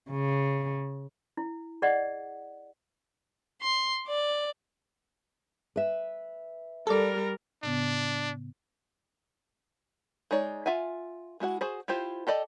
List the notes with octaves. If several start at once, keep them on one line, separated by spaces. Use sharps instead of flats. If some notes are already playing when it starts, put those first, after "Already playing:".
C#3
E4
G#4 D5 D#5 F#5
C6
D5
B4 E5
G3 A4 A#4 D5
A2 C#3 B3 D4
G#3 D#4 C#5 D5
F4 E5 F#5 G#5
G#3 E4 F#4 F#5
F#4 G#4 C5
E4 F4 G4 C5
G4 A4 D5 D#5